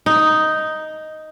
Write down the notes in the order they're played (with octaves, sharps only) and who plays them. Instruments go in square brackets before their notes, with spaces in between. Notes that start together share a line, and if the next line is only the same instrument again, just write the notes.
[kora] D#4